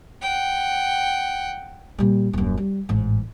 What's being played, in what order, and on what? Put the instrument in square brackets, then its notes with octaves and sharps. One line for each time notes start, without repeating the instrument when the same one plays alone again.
[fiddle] F#5 G5
[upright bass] A#2 G3
D#1 F#2
G3
A1 G#2